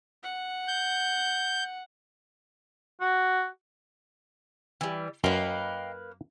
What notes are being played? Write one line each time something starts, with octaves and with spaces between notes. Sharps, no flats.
F#5
G6
F#4
E3 G3
F#2 A#3 B4 D#5 F5 G5